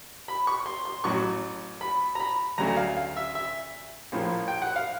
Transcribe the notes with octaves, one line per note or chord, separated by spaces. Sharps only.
B5
C#6
C6
C6
A1 A2 F#3 C#6
B5
A#5
B5
D2 C#3 F#3 A3 A#5
F5
F5
E5
E5
A#1 A2 F3 A#3
G5
F#5
F5